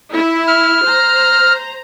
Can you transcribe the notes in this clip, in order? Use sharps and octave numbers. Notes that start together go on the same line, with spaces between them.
E4
F6
C5 A#5